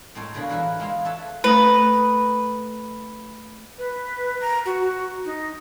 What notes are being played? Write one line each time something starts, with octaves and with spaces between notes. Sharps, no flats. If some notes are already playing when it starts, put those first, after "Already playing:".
A2 G#3 C4 A4 A#4 C#5
B2 D3 A#3 G#4 C#5 B5
E3 E4 A#4 B4
G#3 E4 F4 G#4 B4 F5
A4 B4 C#5 E5
A3 B4 A#5 D#6
B4
A#5
F#4
D#4